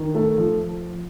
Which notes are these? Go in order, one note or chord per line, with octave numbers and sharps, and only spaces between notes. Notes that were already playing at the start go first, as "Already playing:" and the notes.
Already playing: D#3
A3
F3